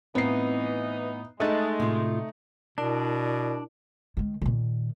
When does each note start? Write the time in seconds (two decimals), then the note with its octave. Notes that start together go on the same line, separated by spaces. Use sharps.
0.15 A2 E3 B3 C4 D#4 F5 C7
1.40 G#3 A3 D#4 E5 A5 D#6 F#6 A6
1.80 A2 C3 F4
2.78 B2 D4 E4 A#4 D5
4.17 D#3 G#3
4.41 A#2 D#3